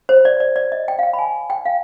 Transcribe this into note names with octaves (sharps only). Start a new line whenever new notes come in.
C5
D5
D5
D5
D#5
G5
F5
G5
B5
G#5
G5
F5